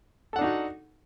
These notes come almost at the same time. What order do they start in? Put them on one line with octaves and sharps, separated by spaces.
A4 F#5 D4 D#4 F#4